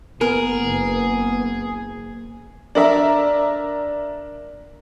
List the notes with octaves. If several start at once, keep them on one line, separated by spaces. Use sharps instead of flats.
F#1 B3 G#4 A#4
D4 A#4 E5